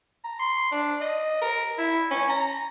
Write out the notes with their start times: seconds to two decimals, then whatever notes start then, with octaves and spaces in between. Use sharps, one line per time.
0.24 A#5
0.40 C6
0.72 D4
1.01 D#5
1.42 A#4
1.78 E4
2.11 C#4
2.30 A#5